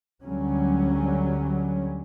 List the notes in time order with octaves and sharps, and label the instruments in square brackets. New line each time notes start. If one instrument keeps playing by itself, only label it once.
[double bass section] D2 D3 F#3 G3 C#4